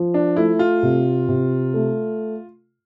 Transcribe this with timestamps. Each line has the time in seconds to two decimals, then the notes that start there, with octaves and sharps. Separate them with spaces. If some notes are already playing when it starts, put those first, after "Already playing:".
Already playing: F3
0.14 D4
0.36 A3 E4
0.59 F4
0.83 C3
1.28 C3
1.74 A3